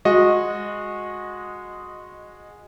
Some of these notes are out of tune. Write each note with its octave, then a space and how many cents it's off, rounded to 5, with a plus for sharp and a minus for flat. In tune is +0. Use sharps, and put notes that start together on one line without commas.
G#3 -10 F#4 -25 D#5 +0